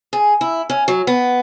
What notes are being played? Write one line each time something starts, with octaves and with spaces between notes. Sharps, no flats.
G#4
E4
C#4
F#3
B3